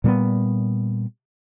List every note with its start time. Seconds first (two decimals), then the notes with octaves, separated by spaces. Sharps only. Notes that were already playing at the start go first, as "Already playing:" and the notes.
0.04 A#2 G3 G#3 B3